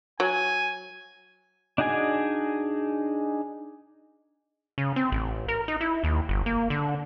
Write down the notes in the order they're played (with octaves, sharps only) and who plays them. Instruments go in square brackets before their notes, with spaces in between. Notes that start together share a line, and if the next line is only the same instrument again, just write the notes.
[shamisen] F#3 [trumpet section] G#5
[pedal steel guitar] D4 D#4 F#4 G#4 G#5
[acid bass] C#3
C4
A1
A#4
D#4
E4
D#2
G1
A#3
D3